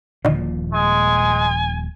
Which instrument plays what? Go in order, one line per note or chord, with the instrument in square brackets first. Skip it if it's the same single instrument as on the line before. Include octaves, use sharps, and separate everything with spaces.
[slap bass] D#1 A#2 F3 [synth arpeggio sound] D3 D#3
[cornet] G#3 [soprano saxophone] G#5